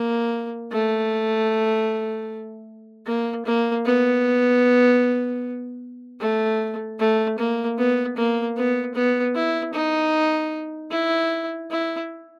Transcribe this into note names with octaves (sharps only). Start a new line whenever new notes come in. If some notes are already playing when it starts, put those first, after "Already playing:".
Already playing: A#3
A3
A#3
A#3
B3
A3
A3
A#3
B3
A#3
B3
B3
E4
D#4
E4
E4